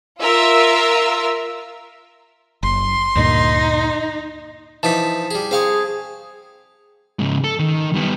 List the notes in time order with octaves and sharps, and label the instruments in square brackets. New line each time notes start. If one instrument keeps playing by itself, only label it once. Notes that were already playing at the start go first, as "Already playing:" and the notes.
[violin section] F4 A#4 E5 E6
[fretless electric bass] F#1 [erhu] C6
[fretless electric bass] D2 G2 A#2 [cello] D#4
[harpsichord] E3 F3 D#4 [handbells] A5 B6
[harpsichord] G3 G#4
[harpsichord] C4 F5 C#6 [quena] G#4
[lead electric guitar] G#2 C#3
A4
D#3
G3 B3